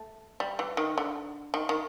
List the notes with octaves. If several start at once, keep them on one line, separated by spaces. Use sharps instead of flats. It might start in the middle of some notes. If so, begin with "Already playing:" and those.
Already playing: A3
G3
E3
D#3
D3
D#3
D#3